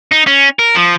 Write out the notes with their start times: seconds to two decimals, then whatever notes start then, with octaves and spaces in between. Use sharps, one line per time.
0.12 D#4
0.27 C#4
0.59 A#4
0.76 F3